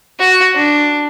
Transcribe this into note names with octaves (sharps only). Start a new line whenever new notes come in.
F#4
D4